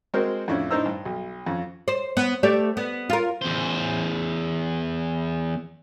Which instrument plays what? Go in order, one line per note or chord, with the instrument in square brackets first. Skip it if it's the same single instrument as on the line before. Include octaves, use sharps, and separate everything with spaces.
[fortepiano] G#3 C4 F#4 A#4 C5
F2 A2 C#4 D4 E4
A2 D4 D#4 C5 A#5 E6
G2
B1
F2 C#4
[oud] C5
B3
A3 G4 D5
B3
F4 A#4
[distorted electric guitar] E2 C5